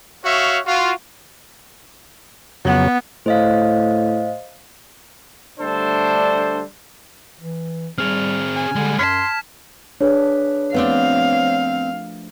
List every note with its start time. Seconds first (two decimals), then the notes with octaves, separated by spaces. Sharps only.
0.25 F#4 C#5 E5 F5
0.66 F4 F#4
2.65 F2 C#3 F#3 B3
3.26 A2 C5 D#5 F5
5.60 D3 G3 A3 D4 A4 C5
7.41 E3
7.98 G3 C4 G#4 F6 F7
8.56 G#5
8.75 D3 G3 G#3
8.99 F#2 C#5 A5 C6 F6 G#6 B6
10.01 D4 G#4 B4 C#5
10.74 F3 A3 B3 C4 D4 F5